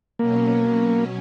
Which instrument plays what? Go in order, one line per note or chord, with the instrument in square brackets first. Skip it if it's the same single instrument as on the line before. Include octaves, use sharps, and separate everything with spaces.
[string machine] B2 F#3 C#4 [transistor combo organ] A#3